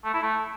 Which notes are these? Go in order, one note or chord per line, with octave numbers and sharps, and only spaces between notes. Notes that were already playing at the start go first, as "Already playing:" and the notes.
A3
E4
A3